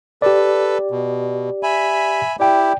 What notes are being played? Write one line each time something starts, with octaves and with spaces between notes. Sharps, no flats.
G4 A4 B4 D5
B2
E5 G#5 B5
E4 G4 D5 G5